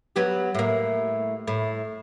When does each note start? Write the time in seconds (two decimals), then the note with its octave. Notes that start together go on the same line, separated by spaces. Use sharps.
0.16 F#3 B3 G4
0.55 A2 A#3
1.47 A2